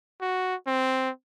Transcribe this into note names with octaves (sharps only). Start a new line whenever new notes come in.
F#4
C4